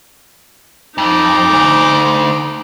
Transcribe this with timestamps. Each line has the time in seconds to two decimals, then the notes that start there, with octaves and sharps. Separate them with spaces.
0.98 F2 D#4 D6
1.53 D2